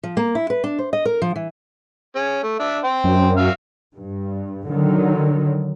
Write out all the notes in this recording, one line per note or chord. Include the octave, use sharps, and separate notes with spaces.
F3
A#3
E4
B4
D4
C5
D#5
A#4
F3
E3
C#4 G#4
A3
D4 E5
C5 G5
F#2
F#4 E5 F5
G2
D3 D#3 F#3